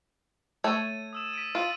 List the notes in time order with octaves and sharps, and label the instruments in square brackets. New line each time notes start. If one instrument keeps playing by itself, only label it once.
[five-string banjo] A3 C#5 [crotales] G#6 A6 D#7
[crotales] D#6 E6 E7
B6 D7 D#7
[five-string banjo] F4 [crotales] D7 D#7 F#7